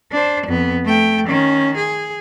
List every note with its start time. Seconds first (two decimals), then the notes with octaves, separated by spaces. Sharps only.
0.12 D4 C5
0.47 F2 B3
0.85 A3 G5
1.27 D#3 C#4
1.77 G#4